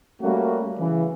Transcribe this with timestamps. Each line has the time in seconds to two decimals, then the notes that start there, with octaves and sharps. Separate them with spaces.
0.22 G3 A3 A#3 C#4 F#4
0.78 C#3 E3